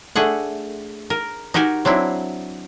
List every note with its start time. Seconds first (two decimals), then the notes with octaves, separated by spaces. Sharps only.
0.16 A3 D4 G#4 F#5
1.10 A#4
1.54 D#4 F#4 G4 A#4 G#5
1.85 F#3 C4 D4 E4